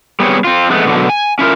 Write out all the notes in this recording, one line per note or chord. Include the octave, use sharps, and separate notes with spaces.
G3 B3 C4 G#4 C#5
C4 F4
F2 G#3 A3 B3
B2 D3 F#3
G#5
C#4 E4 F4 A#4